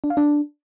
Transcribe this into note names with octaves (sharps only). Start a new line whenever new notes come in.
D4
F5
D4